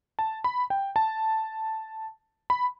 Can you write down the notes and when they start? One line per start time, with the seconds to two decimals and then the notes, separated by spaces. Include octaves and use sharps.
0.19 A5
0.44 B5
0.70 G5
0.96 A5
2.50 B5